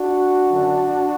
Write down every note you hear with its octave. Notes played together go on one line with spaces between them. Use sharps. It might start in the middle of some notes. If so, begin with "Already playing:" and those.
Already playing: D4 F#4
F#2 D3